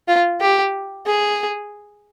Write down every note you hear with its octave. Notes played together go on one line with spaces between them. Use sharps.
F4
G4
G#4